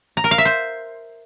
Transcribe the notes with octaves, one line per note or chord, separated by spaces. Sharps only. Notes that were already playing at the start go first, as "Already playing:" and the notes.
A#5
A#4
F5
E5
C5